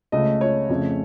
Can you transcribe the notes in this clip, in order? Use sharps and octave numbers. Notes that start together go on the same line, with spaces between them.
C#2 C#3 A3 D#5
C#5
F2 C#3 A3